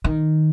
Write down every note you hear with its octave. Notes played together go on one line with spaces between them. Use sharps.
D#3